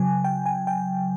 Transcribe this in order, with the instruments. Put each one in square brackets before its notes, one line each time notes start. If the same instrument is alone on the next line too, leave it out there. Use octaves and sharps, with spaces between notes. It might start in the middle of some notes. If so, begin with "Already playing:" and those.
Already playing: [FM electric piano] C#3 F#3 G#5
G5
G#5
G5